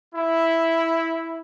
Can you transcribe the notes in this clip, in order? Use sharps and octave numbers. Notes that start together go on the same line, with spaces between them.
E4